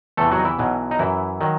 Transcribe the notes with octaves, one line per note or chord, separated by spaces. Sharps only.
E2 C3 E3 A3 A4
F#3 F#4
D#4
E3 E4
B1 B2 F#3
D#4
F#2 E3 E4
D#3 F#3